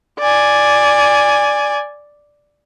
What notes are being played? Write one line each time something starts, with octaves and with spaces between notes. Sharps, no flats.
D5 G#5